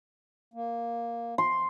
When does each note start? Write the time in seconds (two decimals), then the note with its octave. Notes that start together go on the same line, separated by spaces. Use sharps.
0.54 A#3
1.38 C6